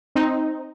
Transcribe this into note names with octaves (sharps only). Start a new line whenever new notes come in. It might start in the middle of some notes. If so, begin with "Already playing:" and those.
C4 D#4